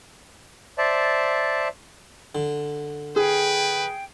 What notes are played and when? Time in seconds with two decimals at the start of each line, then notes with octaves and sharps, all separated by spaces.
0.78 C5 D5 E5 A5
2.35 D3
3.16 G#4 B4 G5